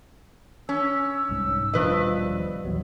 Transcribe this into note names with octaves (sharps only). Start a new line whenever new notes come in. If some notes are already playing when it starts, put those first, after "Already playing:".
C#4 E6
C2 G#2
D#1 G2 B2 F3 B4 D#5
A#1 E2 F#3